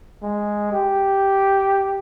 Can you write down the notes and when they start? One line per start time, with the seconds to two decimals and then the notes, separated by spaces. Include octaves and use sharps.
0.22 G#3
0.72 G4